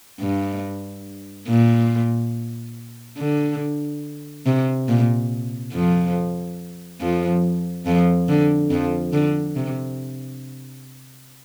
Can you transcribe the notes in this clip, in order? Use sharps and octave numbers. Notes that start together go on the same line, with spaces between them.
G2
A#2
D3
C3
A#2
F2 F3
F2 F3
F2 F3
D3
F2 F3
D3
C3